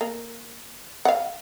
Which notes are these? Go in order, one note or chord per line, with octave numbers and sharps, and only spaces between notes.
A#3
F5 F#5